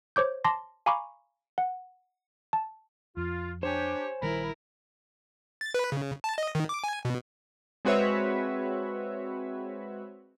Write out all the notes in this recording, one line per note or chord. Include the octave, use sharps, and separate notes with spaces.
C5 C#5 D6 G6
A5 C6 D6 A#6
F5 G#5 A#5 B5 C#6 D6
F#5
A5
F2 F4
D4 G4 C5 C#5 G#5
A#1 D#3 G3 E4 A#4 B5
A6
B4
C#3
A5
D#5
D#3
D6
G#5
B2
G#3 C4 F#4 B4 C#5 E5